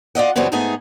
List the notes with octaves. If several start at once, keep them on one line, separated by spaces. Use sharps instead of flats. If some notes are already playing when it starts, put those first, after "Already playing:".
F4 D5 D#5 F#5
F#2 C#3 E3 G3 B3 C4
G#2 A3 B3 D#4 G#4 G#5